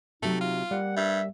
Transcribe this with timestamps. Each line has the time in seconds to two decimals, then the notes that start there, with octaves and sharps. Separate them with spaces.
0.22 C3 F#3 A3 D#4 G4
0.41 F4
0.71 G3 A#3 F#5
0.96 G2 E5